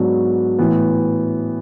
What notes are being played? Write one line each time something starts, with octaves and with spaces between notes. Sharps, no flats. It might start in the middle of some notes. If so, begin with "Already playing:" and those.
Already playing: G#2 F#3 B3 D4
A2 E3 B3